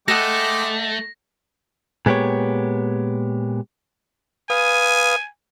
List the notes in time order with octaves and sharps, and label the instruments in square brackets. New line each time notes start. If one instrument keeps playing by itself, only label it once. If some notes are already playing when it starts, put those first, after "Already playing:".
[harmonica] G#3 G5 D6 [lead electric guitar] A3 [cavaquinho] A4 D#5 F#5 [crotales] A#6
[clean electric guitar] A#2 G#3 B3 G4 C#5
[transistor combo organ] B4 F5 D#6 [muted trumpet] G#5